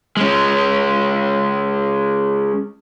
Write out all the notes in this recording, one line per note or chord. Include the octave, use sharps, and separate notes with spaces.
G#3 C#4